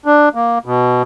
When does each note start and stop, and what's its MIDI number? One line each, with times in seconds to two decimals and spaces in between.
0.06 0.29 62
0.35 0.59 58
0.66 1.02 47